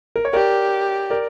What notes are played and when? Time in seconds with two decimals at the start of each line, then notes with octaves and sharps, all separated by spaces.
0.16 A#4
0.25 C#5
0.33 G4 A#4 D5
1.10 A#4 D5